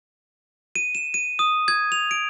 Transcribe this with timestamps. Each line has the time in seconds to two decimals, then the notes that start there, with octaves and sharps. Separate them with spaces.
0.75 D#7
0.95 E7
1.14 D#7
1.39 D#6
1.68 G#6
1.92 F7
2.11 D7